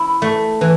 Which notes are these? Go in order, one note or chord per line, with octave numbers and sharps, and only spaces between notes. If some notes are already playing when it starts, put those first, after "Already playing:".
Already playing: E4
A3
E3